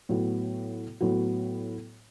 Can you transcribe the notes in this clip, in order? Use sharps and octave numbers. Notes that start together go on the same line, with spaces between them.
A2 F#3 B3 F#4
A2 F#3 B3 F#4